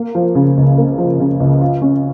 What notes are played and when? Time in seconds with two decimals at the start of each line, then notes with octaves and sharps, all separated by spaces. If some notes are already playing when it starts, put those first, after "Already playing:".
Already playing: A#3
0.15 F3
0.35 C#3
0.57 C#2
0.78 A#3
0.98 F3
1.20 C#3
1.40 C#2
1.61 F4
1.82 C#4